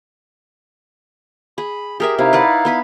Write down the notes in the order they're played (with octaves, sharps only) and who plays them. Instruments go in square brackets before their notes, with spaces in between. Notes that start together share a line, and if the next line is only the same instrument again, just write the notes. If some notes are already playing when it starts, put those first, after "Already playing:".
[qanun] G#4 [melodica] B5
[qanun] G4 A#4 E5 [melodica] G#4
[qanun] C3 [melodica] D#4 E4 F5
[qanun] B4 D5 F#5
B3 B4 B5